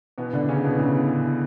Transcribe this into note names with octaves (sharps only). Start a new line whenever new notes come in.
B2 E3 B3
A2 D3 D4
A2 C#3 C#4
B2 E3 B3
A2 C#3 C#4
A2
E3
A2